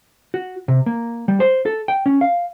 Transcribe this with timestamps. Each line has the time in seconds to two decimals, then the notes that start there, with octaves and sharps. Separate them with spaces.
0.34 F#4
0.68 C3
0.86 A#3
1.28 G3
1.40 C5
1.66 A4
1.88 G5
2.06 C#4
2.21 F5